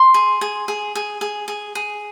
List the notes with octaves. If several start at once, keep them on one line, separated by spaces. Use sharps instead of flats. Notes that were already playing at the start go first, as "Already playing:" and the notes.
Already playing: C6
G#4
G#4
G#4
G#4
G#4
G#4
G#4